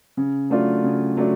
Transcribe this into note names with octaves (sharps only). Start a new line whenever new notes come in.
C#3
F#3 A3 D4 F4
C#3
F#3 A3 D4